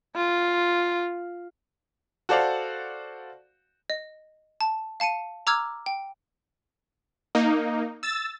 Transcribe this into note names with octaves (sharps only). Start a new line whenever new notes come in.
F4
F#4 A4 C5 D5 F5 F#5
D#5
A5
F5 A5 C#7 D#7
A#5 D6 E6 F6 G#6
G5
A#3 D#4
E6 A6